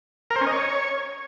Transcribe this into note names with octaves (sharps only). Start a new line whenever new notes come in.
A#4
C5
C#4
D#5
C#5